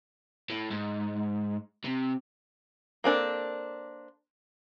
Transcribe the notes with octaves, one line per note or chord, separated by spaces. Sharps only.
A2
G#2
C3
A#3 C4 D4 A4